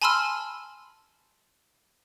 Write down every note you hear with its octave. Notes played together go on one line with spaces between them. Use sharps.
G#5 A5 B5 C6 E6 F6